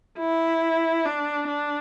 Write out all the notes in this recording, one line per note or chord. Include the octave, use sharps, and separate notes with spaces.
E4
D4
D4